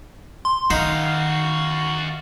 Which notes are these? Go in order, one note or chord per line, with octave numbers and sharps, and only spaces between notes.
C6
D#3 D#4 F#4 F5 C7